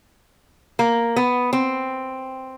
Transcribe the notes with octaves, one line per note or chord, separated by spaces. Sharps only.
A#3
B3
C4